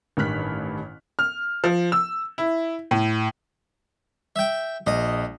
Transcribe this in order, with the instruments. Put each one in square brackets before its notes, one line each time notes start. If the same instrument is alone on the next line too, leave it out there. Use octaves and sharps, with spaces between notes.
[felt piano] A1 G2 D#3 F6 F#6 B6
[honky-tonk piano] F6
F3
E6
E4
A2
[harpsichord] E5 G5
[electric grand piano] A#1 [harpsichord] D#5